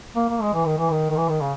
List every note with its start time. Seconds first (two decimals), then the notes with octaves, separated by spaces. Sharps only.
0.16 A#3
0.29 A#3
0.41 G#3
0.54 E3
0.65 D#3
0.78 E3
0.90 D#3
1.10 D#3
1.17 E3
1.29 D#3
1.41 C#3